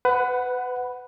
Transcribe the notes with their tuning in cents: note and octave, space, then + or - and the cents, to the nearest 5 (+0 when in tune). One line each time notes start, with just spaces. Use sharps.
B4 +30 F#5 +0 B5 +0